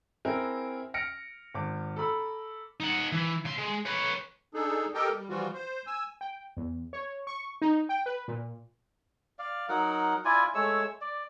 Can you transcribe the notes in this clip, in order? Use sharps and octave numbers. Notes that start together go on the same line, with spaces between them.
C4 E4 G#4 A#4
F6 A#6 C#7 D7
G#1 D6
A4 A#5 B5 E6
D#4 F#5
E3
C#3 C6
G#3
B4 C#5
D4 D#4 G#4 A4
G4 A4 A#4 D#5 G5
G3
E3 F3 G3 F4 F#4
C5
G#5 E6
G5
E2
C#5
C#6
D#4
G5
B4
A#2
D5 F5
F#3 D#4 A#4 F#5
E4 F4 D5 G#5
G#3 A3 C#5 E6
D5